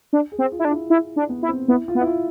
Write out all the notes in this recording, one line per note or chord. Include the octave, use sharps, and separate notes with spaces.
D4
G#4
C4
F4
E4
D4
E4
E4
D4
B3
E4
C4
B3 E4
F4
B3
E4
F4